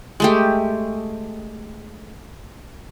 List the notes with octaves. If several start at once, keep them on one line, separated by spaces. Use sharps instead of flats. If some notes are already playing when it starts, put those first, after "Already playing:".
G#3 A3 G4